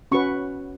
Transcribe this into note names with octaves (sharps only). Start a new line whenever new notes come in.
C#4 F#4 B4 C#6